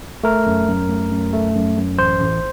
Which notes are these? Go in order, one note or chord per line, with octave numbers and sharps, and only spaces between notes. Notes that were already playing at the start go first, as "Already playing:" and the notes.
A3 A#4
F#2
F#2
A3
F#2
A3
F#2
F#2
A1 C5
A1